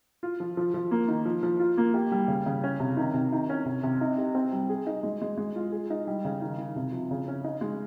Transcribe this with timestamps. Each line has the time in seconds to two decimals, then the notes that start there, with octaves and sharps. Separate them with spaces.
0.23 F4
0.40 F3
0.57 F3
0.74 F3
0.91 A#3
1.08 D#3
1.25 F3
1.43 F3
1.60 F4
1.78 A#3
1.94 G4
2.12 G3
2.28 C#3
2.46 C#3
2.64 C#4
2.80 C3
2.97 D#3
3.14 C3
3.32 D#3
3.50 C#4
3.66 C3
3.83 C3
4.01 D#4
4.18 G4
4.35 C4
4.53 G3
4.70 G#4
4.87 D#4
5.03 G#3
5.22 G#3
5.38 G#3
5.56 F4
5.72 G#4
5.90 D#4
6.07 G3
6.25 C#3
6.42 D#3
6.58 D#3
6.76 C3
6.92 F3
7.11 C#3
7.28 C#4
7.44 D#4
7.61 G#3